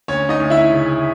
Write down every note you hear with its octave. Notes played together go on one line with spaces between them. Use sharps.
D2 C#4 C#5
D#4 D#5
D2
E4 E5
C#3